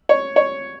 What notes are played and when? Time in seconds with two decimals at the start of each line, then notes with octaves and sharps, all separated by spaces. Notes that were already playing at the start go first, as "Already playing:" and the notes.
0.09 C#5
0.36 C#5